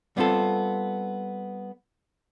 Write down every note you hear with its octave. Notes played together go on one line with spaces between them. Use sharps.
G3 B3 C4 F4 A4